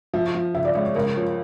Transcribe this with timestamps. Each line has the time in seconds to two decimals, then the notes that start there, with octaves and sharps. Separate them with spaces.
0.14 F3 E5
0.35 F3
0.54 C#3 E5
0.65 D5
0.75 C#2 C#5
0.85 C#5
0.95 C#2 A#4
1.15 F3 C#5